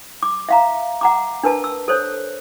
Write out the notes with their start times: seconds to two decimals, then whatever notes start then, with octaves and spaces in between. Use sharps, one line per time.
0.23 D6
0.49 E5 F5 A#5
1.01 F#5 A#5 D6
1.43 D4 A#4 B4 A5
1.64 E6
1.88 A4 C5 C#5